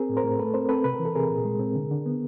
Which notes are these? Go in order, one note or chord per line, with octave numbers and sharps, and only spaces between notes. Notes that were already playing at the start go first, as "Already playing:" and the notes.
Already playing: C4 G#4 A#4
A2
A#4 C5
A2
A3 A4 B4
C4 A#4 C5
C4 A4 B4
C3 B4
E3 A#4
A4
C3 G#4 A#4
A#2
G#3
C4
D3
D3
B3